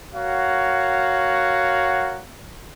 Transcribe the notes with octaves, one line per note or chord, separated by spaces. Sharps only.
F#4 A#4 C#5 F5 F#5